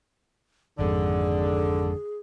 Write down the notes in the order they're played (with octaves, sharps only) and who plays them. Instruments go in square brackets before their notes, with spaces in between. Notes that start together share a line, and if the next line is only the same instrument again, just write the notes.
[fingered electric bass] G#1 F2 G#2 [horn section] D3 [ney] G#4